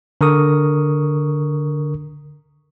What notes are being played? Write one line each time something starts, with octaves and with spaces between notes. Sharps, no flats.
D3 A#4 C#6 D#6